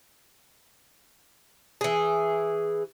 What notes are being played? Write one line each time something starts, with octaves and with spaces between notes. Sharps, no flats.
E3 G#4